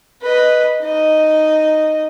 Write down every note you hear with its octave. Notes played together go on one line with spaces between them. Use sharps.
B4 D#5
D#4 D#5